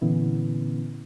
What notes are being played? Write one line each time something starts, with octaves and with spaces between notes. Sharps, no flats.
A#2 D3 E3 B3 C#4 E4